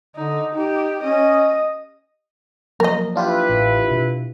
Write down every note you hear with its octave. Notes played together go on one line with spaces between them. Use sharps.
D3 D#4
D#4 G4
C#4 D#5
F3 F#3 A#3 A#4 D#5
D4 E4 F4 G4 B4
A1
B2